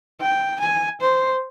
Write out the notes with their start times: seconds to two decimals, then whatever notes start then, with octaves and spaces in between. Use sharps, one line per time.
0.21 G5
0.60 G#5
1.01 C5